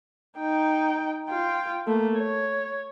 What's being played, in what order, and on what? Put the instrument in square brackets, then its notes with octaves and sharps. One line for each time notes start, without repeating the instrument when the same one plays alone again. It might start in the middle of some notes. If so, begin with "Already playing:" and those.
[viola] D#4 G5
F4 G5
A3 A#3
C#5